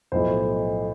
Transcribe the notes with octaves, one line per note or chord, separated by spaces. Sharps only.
B1 A2 F3 C5